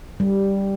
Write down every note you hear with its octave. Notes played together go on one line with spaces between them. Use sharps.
G3